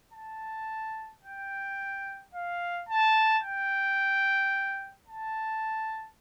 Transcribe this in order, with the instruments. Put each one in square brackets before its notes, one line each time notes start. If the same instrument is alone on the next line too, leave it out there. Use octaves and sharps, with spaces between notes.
[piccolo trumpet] A5
G5
F5
A5
G5
A5